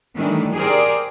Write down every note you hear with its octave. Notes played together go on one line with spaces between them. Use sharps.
D#3 E3 F#3 G3 A3 D4
G4 G#4 A#4 C5 D5